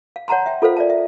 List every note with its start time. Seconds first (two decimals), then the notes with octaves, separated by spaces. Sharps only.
0.16 F5
0.28 C#5 F#5 A5 A#5 C6
0.46 E5 G5
0.62 F4 A4 A#4 C5 F5
0.77 D5 E5 A5
0.90 E5